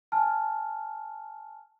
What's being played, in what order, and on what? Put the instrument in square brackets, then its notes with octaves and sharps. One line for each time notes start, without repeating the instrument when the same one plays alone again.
[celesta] G#5 A5 F6